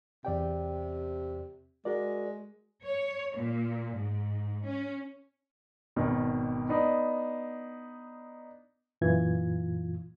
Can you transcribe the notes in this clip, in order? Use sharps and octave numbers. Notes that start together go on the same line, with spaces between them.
E2 C3 D5 G5
G#3 F#4 A#4 D5
C#5
A#2
G#2
C#4
G#1 B2 D#3
B3 D4 D#4
F#2 A#2 E3 F4 G#6